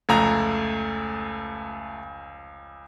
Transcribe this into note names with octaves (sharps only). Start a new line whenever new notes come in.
F1 C#2 A3 A#5